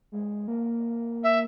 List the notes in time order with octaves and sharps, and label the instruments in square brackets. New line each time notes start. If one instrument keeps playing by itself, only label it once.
[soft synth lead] G#3
A#3
[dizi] E5